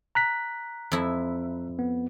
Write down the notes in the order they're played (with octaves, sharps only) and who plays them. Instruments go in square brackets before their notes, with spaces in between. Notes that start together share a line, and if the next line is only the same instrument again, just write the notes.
[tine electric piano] A#5 F#6 B6
[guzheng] F2 E4
[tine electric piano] B3